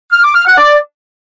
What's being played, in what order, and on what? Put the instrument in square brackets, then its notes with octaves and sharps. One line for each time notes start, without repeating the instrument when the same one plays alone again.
[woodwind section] F6
D6
F6
F#5
D5